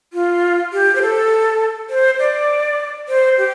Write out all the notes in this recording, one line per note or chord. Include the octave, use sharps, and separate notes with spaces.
F4
G4
C5
A4
C5
D5
C5
G4